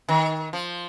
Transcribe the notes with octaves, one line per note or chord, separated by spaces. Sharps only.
D#3
F3